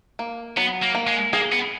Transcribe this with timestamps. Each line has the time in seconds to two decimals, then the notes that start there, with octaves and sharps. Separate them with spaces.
0.19 A#3
0.57 F#3 B3
0.83 A#3
0.95 A#3
1.07 G#3
1.33 A#3 G#4
1.52 B3